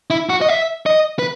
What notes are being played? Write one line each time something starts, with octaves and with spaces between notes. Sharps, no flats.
E4
F#4
D#5
E5
D#5
B4